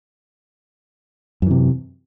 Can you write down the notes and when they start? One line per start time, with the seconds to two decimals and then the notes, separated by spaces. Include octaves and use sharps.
1.42 F#2
1.46 E3
1.51 C3